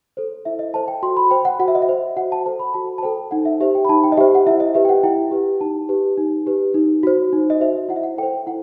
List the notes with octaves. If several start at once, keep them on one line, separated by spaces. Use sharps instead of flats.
A4 C5
E4 E5
D#5
A4 C5 A5
G5
F#4 C6
B5
C5 G5
F#5
F#4 F#5
E5
D#5
E5
C5
F#4 F#5
A5
A4 C5 A5
B5
F#4 A5
A5
A4 C5 G5
D#4 F#5
E5
G4 C5 E5
G5
B5
D#4 A5
G5
D#5
G4 C5 E5
F#5
E4 E5
D#5
G4 B4 E5
G5
F#5
E4 G5
G4 B4
D#4 A5
G4 B4
D#4
G4 B4
D#4
F#4 C5
D#4
D#5
F#4 C5 E5
E4 F#5
E5
F#5
A4 C5 G5
E4 F#5